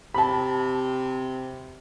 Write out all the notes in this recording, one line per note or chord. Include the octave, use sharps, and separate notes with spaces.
C3 A5 B5